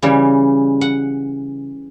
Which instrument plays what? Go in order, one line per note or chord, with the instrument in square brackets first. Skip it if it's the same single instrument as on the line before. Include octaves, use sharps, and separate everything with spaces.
[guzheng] C#3 E3 G3
F#5